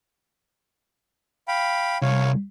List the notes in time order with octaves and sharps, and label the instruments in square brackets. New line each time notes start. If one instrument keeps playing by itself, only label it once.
[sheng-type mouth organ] F5 G5 B5
[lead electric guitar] C2 [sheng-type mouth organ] C#5 F5